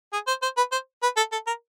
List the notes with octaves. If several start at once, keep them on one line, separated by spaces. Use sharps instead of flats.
G#4
C5
C5
B4
C5
B4
A4
A4
A#4